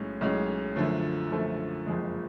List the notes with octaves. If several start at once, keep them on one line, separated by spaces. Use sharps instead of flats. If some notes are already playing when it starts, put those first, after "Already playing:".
Already playing: B1 A2 G#3 C#4
B1 A2 G#3 C#4
F#2 D3 F3 A3
F#2 D3 F3 A3
F#1 F2 F3 G#3